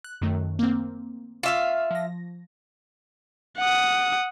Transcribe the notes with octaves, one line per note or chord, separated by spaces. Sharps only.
F#6
F#2 D#3 A3
A#3 C4
F4 E5 F5 C#6 D6 F6
F3 A#6
F#5 D#6